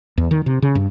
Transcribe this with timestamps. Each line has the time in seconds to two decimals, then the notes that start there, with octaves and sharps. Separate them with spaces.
0.18 E2
0.31 D#3
0.46 C3
0.62 C#3
0.75 G2